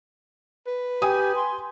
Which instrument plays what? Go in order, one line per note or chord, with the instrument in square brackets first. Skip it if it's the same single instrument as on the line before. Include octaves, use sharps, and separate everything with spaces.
[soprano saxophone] B4
[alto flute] G4 [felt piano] G5 G#5 D#6
[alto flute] C6